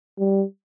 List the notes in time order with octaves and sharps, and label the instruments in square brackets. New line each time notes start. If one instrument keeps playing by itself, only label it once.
[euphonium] G3